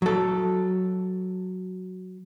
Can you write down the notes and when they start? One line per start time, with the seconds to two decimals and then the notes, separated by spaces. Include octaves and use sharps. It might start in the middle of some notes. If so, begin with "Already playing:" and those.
0.02 F#3 A4